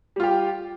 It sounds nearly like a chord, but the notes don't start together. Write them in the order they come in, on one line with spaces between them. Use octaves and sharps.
G3 F4 G4